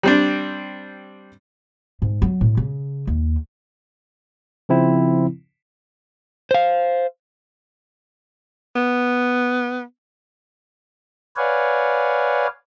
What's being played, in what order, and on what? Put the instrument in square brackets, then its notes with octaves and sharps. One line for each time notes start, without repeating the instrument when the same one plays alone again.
[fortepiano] G3 C4 D4
[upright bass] G#2
F#3
A2
C#3
D#2
[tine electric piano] C#3 F3 C4 E4
[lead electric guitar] C5 F5
[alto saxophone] B3
[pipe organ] B4 C#5 D5 F5 F#5 G#5